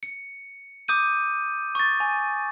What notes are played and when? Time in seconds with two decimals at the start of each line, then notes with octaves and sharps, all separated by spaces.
0.03 C#7
0.88 D6 D#6 G6 D#7
1.75 C#6 A6
2.00 G#5